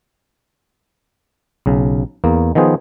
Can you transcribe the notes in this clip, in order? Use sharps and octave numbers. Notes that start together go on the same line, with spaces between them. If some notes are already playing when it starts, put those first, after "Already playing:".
B1 C#3
E2 A#3
D#3 F3 B3 G#4 C5